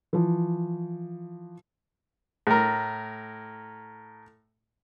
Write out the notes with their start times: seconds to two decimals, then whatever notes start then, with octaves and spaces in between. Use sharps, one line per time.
0.13 E3 F3
2.47 A2 A#4